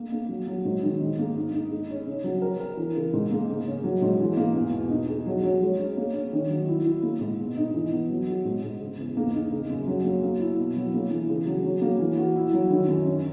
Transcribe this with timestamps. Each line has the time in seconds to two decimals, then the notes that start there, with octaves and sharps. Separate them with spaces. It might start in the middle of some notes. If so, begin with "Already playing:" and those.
Already playing: A#3
0.12 A#3
0.29 F#3
0.47 F#3
0.65 G#2
0.83 D#3
1.01 G#2
1.19 A#3
1.36 D#4
1.54 D#4
1.71 G#3
1.90 C#4
2.06 C#3
2.24 F#3
2.42 A#4
2.60 A#4
2.77 E3
2.96 C#3
3.13 G#2
3.31 A#3
3.49 C#3
3.66 C#4
3.84 F#3
4.02 G#2
4.20 E3
4.37 A#3
4.55 E2
4.73 B2
4.90 D#4
5.09 G#4
5.26 F#3
5.43 F#3
5.62 G#3
5.79 C#4
5.97 A#3
6.15 C#4
6.33 D#3
6.50 F#3
6.68 E4
6.86 E4
7.03 A#3
7.21 G#2
7.38 B2
7.57 D#4
7.74 E3
7.92 B3
8.10 F#3
8.28 F#4
8.45 G#2
8.63 G#2
8.80 C#3
8.99 E2
9.17 A#3
9.33 D#4
9.52 C#3
9.70 F#2
9.87 F#3
10.04 A#3
10.23 A#3
10.40 E4
10.58 B2
10.76 F#3
10.94 A#3
11.11 E3
11.29 C#3
11.46 F#3
11.64 F#3
11.82 A#3
11.99 E3
12.17 F#4
12.36 E4
12.53 F#3
12.70 D#3
12.88 F#2
13.07 C#4